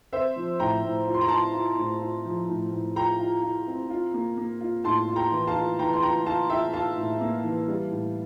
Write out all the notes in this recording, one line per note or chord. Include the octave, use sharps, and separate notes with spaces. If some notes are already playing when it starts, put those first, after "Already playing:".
C4 C5 E5
F3
A2 G5 A#5
A2
F4
C6
A#5
F4 A5 C6
F4
A2
F4
F3
A2
A2
F4 G5 A#5
F4
F4
C4
F4
A#3
A#3
F4
A2 A5 C6
F4
G5 A#5
E3
F5 A5
F4
E3 G5 A#5
C6
F4 G5 A#5
F4 F5 A5
F4 E5 G5
F4 F5 A5
A2
A#3
E3
G3
A2